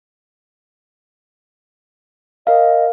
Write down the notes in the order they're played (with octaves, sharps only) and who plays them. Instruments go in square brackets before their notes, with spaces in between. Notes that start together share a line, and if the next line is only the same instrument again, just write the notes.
[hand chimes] A#4 F5 [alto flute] D#5